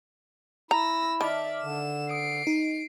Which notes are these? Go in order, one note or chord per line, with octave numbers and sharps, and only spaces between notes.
E4 A#5 E6 A#6
D#3 D5 E5 A5 D6 F6
D3 E7
D#6 C7 D7
D#4